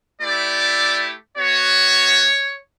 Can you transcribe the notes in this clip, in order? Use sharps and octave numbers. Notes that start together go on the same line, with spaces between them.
A3 E4 G4 D5
B3 F#4 C#5